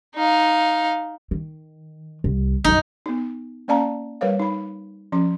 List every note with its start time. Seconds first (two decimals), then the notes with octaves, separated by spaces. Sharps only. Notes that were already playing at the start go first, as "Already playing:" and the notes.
0.16 D#4 F5
1.31 D#3
2.24 C2
2.64 B1 F#2 D#4
3.06 B3 D#4
3.68 A#3 C#4 D5 F5 A5 A#5
4.21 G3 A#4 B4 C#5 F5
4.39 D#4 B5
5.12 F3 C#4 C6